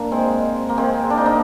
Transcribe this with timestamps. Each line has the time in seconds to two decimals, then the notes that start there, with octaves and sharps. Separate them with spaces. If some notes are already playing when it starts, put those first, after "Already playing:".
Already playing: A#3 D4
0.12 G#3 C4
0.69 A#3
0.78 G#3 C4
1.10 D4
1.18 D#4
1.26 A#3 D4